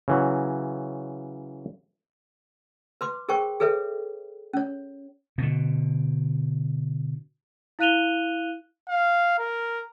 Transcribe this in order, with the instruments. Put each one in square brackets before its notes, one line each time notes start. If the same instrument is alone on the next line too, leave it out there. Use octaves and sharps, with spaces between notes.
[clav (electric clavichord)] C#3 E3 F#3
[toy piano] B4 C6 D6
G#4 A#4 C5 G5 C#6
G#4 A4 B4 C#5 E5
C#4 C#5
[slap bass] B2 D3
[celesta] E4 F5 F#6 D#7 F7 G7
[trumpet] F5
A#4